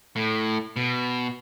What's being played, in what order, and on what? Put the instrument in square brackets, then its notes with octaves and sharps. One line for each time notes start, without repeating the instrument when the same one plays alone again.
[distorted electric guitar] A2
B2